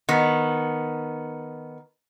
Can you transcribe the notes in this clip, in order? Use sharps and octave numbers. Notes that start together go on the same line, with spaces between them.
D#3 B3